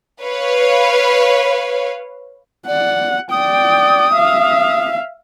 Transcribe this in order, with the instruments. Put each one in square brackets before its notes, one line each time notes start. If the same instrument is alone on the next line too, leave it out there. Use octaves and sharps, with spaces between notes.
[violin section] B4 C#5 F5
[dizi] D5 [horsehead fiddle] F#5
[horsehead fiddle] D5 G5 [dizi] D#6
[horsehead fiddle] E5 F5